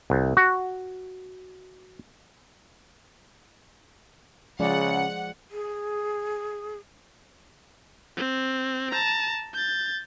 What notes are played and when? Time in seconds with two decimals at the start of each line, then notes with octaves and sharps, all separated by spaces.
0.10 C2
0.37 F#4
4.59 C#3 F3 G#3 D5 F#5
5.51 G#4
8.17 C4
8.91 A5 A#5
9.54 G6 A6